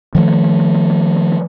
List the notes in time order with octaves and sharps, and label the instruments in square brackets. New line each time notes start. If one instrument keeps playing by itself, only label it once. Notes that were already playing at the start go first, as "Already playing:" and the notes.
[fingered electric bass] D#3 F3 A3